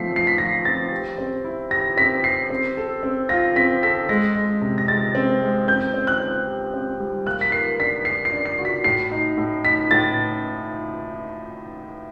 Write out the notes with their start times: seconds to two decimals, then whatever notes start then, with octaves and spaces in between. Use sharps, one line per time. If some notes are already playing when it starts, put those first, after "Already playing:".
Already playing: F3 A3 C4 B6 C7
0.12 F3 C7
0.27 B6
0.38 F3 A#6
0.65 C4 A6
0.92 G4
1.18 C4
1.44 E4
1.71 G4 A#6
1.97 C4 B6
2.24 G4 C7
2.50 C4
2.77 A4
3.03 C4
3.29 F4 A#6
3.56 C4 B6
3.83 A4 B6
4.09 G#3 A#6
4.36 G#3
4.62 C3
4.78 A#6
4.88 G#3 A6
5.15 C4
5.42 G#3
5.68 C4 G6
5.94 C4
6.07 F#6
6.20 C4
6.47 G4
6.74 C4
7.00 G3
7.26 A#3 F#6
7.41 B6
7.52 A#4 C7
7.79 D4 B6
8.05 A#4 C7
8.25 C7
8.32 D4
8.45 C7
8.59 F#4
8.65 B6
8.84 A2 C7
9.11 D#4
9.38 A2
9.65 D#4 B6
9.91 A2 A6